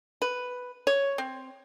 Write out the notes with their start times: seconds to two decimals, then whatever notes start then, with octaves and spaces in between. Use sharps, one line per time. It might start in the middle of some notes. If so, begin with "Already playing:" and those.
0.22 B4
0.87 C#5
1.18 C4